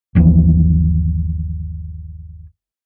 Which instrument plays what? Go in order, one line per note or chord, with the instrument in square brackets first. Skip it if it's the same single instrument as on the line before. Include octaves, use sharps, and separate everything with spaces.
[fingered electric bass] G1 D#2 E3 F3